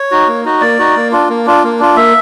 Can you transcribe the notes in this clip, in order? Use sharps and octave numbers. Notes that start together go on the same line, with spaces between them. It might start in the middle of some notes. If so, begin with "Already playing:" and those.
Already playing: C#5
D#4 F#4
A#3
D#4 F#4
A#3 D5
D#4 F#4
A#3
D4 F4
A#3
D4 F4
A#3
D4 F4
A#3 E5